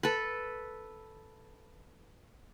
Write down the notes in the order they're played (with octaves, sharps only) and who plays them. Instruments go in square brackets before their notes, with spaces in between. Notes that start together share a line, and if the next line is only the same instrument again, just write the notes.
[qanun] A4 B4